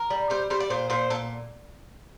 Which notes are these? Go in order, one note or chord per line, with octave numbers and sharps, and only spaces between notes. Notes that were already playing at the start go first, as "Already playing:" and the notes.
Already playing: A#4
G3
G3 C5
G3 C5
D5
A#2 C5
A#2 C5
A#2 A4